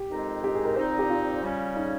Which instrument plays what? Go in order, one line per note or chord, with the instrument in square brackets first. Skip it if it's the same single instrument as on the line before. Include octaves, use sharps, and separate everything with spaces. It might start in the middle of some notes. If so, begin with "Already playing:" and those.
Already playing: [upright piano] G4
[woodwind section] F2 D#3 G#3 C4 D#4
[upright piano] G4
G#4
A#4
[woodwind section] A#2 G3 C4 D#4 [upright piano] C5
[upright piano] G4
F4
[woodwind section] C#3 G3 C#4
[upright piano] D#4